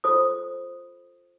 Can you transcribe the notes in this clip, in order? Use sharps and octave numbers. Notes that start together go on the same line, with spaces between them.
F4 A4 C5 D#6